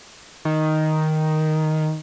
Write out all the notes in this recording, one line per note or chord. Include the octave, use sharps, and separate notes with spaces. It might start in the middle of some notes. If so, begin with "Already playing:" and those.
D#3